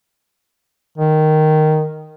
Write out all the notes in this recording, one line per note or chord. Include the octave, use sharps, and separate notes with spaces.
D#3